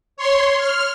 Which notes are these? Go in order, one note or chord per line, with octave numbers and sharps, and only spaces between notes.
C#5 C6
F6